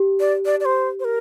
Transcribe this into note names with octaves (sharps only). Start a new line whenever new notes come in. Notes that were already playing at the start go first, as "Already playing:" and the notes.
Already playing: G4
D5
D5
D5
C5
C5
A#4